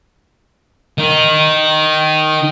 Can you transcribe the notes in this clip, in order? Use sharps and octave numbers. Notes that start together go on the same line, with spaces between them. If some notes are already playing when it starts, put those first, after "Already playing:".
D#3 D#4